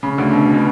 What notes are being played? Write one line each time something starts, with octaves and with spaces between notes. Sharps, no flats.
C#3
D2 D3
B2
B2